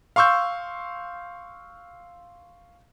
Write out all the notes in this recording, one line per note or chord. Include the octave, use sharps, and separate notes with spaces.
F5 C6 C#6 E6 G6